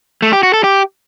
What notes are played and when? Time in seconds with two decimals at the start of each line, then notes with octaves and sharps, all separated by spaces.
0.22 A3
0.33 G4
0.43 F#4
0.53 A4
0.64 G4